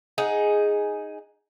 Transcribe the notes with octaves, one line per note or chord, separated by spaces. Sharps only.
D#4 G#4 F#5